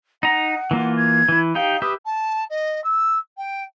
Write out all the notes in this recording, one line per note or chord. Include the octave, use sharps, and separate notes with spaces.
D#4 F#5 A#5
E3 A#3 F4
G#6
E3 E4
D#4 G4 F5 G5
G4 B4 E5 D#6
A5
D#5
E6
G5